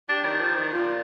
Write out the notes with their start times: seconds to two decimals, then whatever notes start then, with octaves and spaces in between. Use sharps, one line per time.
0.09 D4 G4
0.25 D#3
0.41 F3
0.56 D#3
0.72 A#2 F4